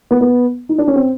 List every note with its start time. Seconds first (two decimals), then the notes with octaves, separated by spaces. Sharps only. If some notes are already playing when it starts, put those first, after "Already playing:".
0.11 B3
0.21 B3
0.69 D#4
0.78 D4
0.88 C#4
0.96 C4